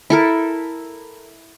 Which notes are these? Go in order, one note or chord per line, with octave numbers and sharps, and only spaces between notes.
E4 A4 A#4